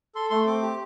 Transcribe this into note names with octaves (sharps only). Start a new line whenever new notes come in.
A4 C6
A3 C6
C4 D6
G4